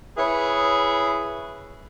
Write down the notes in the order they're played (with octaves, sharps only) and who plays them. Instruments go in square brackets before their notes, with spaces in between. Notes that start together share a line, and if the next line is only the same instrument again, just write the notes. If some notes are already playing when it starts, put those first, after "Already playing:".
[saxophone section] E4 G#4 B4 C#5